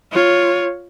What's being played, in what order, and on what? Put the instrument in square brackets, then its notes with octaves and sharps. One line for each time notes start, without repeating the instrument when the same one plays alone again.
[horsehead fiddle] F4 C#5